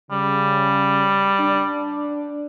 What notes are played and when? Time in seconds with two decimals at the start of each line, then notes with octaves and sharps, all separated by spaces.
0.11 C#3 G3
1.39 D4